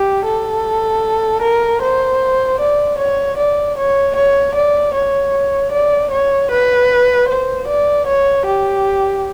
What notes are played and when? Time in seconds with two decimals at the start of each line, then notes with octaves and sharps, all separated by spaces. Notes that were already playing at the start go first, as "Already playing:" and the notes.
Already playing: G4
0.25 A4
1.42 A#4
1.82 C5
2.60 D5
2.99 C#5
3.37 D5
3.77 C#5
4.16 C#5
4.55 D5
4.94 C#5
5.72 D5
6.11 C#5
6.51 B4
7.28 C5
7.67 D5
8.07 C#5
8.46 G4